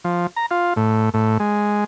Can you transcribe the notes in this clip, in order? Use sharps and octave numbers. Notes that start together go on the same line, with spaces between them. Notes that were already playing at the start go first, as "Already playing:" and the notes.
F3
A#5
F4
A2
A2
G#3